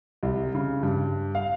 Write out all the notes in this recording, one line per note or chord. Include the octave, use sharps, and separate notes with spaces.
C2
C#3
G2
F5